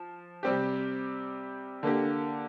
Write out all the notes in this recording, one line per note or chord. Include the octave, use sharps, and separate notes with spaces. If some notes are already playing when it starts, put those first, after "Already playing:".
Already playing: F3
C3 G3 C4 G4
D3 A#3 G4